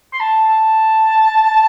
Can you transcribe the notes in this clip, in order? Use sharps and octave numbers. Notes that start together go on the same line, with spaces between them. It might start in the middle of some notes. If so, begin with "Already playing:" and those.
C6
A5
A5